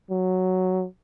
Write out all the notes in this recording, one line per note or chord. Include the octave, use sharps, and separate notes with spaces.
F#3